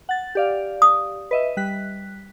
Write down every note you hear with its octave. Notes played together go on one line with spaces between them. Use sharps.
F#5 A6
G4 D5 F5
D#6
B4 D#5 E5
G3 F#6 B6